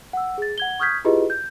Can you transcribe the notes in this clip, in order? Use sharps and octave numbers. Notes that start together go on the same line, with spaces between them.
F#5 E6
G#4 A6
F#5 G#6 G7
C#6 D#6 F6 G6 G#6 B6
E4 F4 G4 G#4 B4 D#5
G6